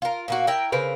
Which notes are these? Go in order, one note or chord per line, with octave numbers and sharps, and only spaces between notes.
F4 A#4
A#2 A#3 F#4
E4 A#4 G5
C#3 C4 A#4 B4